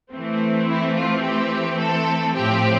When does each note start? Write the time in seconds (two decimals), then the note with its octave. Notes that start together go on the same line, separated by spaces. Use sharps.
0.12 E3 A3 C4
0.69 E4
0.97 F4
1.24 G4
1.80 A4
2.37 A2 F3 C4 G4